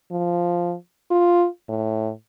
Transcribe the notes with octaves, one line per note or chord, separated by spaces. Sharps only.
F3
F4
A2